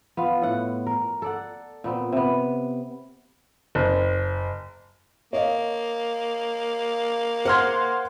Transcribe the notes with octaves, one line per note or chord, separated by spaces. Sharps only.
B3 F4 F5
A2 F#5
A#4
A4 D5 F#5
A#2 B3 C4
C3 B3
F#1
A#3 C#5 D#5 F5
C5 F#5 C6 F6 G#6